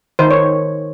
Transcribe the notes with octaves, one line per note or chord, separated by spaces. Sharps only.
D#3 C5
C#5